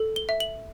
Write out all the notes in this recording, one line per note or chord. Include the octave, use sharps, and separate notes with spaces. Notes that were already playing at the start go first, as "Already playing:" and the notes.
Already playing: A4
G7
E5
F#7